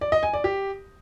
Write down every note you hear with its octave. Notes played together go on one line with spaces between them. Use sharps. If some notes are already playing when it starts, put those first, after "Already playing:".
D5
D#5
G#5
D5
G4